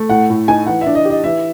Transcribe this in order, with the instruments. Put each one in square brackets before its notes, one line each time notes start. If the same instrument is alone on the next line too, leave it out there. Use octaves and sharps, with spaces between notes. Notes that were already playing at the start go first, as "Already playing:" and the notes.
Already playing: [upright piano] A3
[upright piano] A2 [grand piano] F#5
[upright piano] A2
[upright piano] D#4 [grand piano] G#5
[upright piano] E3 [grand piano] F#5
[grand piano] E5
[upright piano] D4
[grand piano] D#5
[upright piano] G4
[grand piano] D#5
[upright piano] E3 [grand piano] E5